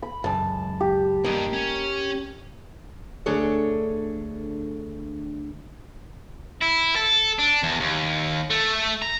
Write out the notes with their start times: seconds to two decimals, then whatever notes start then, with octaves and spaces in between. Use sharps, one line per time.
0.02 B5
0.24 C#2 F#2 A5
0.80 G4
1.24 G2 A#3 D#5
1.53 C#4
3.26 D2 D4 G#4 A4 C#5
6.62 E4
6.96 A4
7.39 D4
7.63 E2
7.80 D#2
8.50 A3
9.02 A#5